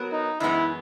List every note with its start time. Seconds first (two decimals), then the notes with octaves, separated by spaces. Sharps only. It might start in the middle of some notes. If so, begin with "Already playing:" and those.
Already playing: F#3 B3 F#4 A#4
0.12 D#4
0.40 F#2 E3 G#3 B3 D#4 E4